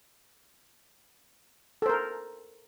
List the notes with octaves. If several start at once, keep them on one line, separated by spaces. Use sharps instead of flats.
A4 A#4 C5